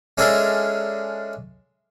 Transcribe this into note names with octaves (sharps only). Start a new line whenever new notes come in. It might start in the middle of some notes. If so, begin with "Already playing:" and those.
G#3 C#4 D4 E4 A4 A#4